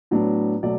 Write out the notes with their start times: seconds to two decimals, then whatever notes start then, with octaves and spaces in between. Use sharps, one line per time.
0.11 A2 F#3 B3 D4
0.63 B2 F#3 A3 D5